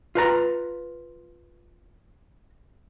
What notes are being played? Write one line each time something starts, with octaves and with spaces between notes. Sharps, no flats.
F4 B4 A#5